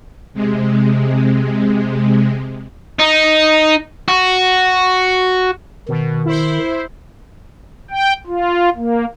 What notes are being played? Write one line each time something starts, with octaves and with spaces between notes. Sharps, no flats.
C3 G#3
D#4
F#4
B2 D#3
E4 C5
G5
F4
A#3